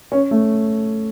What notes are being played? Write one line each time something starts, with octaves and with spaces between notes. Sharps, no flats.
C#4
A3